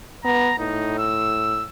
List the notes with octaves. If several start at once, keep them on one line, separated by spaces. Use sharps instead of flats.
B3 A#5
A2 D#4
E6